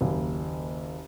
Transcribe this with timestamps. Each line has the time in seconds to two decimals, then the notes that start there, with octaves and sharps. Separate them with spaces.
0.01 F#1 D#2